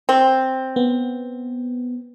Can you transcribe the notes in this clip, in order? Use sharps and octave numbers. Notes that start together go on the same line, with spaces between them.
C4
B3